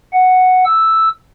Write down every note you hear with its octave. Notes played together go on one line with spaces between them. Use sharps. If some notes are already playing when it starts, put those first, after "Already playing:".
F#5
E6